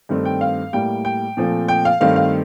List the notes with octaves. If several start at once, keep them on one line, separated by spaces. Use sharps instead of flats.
G2 D#3 A3 C4
G5
F5
A2 G3 A#3 G5
G5
A#2 F3 A3 C4
G5
F5
G2 D#3 A3 C4 F5
F5